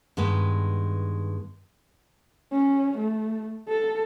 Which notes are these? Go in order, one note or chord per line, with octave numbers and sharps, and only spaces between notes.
G2 D#3 G#3 B3 B4
C#4
A3
A4